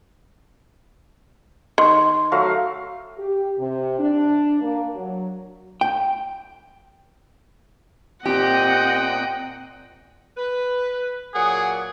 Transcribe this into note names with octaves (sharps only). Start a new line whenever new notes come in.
D#3 C6
F#3 A3 F5
G4
C3
D4
A#3
F#3
G5
A#2 C4 G4 D#5 F#5 G5 G6
B4
A#2 F#3 G#4 F#5